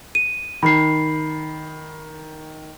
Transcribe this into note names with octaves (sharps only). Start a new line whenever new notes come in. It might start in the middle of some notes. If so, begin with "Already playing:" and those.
D#7
D#3 B5 C7